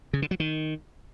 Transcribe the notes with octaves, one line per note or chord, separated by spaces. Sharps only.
C#3
D3
F#3
D#3